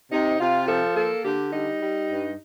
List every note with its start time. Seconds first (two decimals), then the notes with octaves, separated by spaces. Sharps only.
0.12 C3 D#4
0.40 C3 F4
0.68 F3 A4
0.96 A#3 A4
1.24 D3 G4
1.52 G3 D#4
1.81 G3
2.09 G2